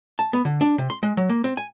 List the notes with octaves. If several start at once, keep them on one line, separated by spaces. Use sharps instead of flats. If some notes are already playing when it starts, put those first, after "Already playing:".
A5
B3
D3
D4
C3
C6
G#3
F#3
A#3
C4
G#5